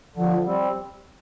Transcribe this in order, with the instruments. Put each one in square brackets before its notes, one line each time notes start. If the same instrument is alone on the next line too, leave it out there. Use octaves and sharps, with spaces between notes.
[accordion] D3 [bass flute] F3
[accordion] G3 C4